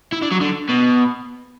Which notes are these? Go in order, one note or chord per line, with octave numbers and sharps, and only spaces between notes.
E4
D4
F#3
D3
B2